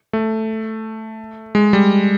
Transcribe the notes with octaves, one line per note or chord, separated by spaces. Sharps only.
A3
G#3
G3